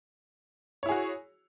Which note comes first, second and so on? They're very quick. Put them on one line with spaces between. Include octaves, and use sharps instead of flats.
C#5 E4 G#4 F#4